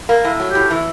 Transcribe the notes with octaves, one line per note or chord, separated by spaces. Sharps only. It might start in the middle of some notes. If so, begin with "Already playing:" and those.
A#3
A2
F#3
G4
A2
E3